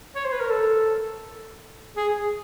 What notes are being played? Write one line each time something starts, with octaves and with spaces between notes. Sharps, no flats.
C#5
C5
B4
A#4
A4
G#4